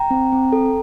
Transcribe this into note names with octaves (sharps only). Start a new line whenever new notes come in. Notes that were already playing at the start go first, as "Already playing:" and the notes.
Already playing: G5 A#5
C4
C4
A4